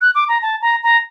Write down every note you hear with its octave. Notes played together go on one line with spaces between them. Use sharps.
F#6
D6
A#5
A5
A#5
A#5